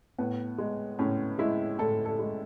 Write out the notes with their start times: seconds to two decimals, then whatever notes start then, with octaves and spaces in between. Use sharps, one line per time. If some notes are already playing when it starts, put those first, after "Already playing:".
0.18 A2 B3
0.58 G#3
0.99 A2 C#4
1.38 G#3 E4
1.78 A2 A4
2.06 A4
2.19 G#3